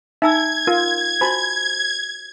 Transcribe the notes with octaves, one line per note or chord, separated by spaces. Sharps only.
D#4 E5 G#5 A#5 E6 G#6
F4 A#4
F#4 C5 G#5 A5 B5